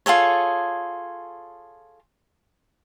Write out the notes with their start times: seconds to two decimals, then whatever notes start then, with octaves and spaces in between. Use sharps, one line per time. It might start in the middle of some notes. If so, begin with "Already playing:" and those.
0.06 F4 G#4 A4 C#5